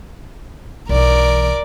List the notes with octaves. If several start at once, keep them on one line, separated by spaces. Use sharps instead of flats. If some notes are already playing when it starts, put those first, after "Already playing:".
B1 E3 A#4 D5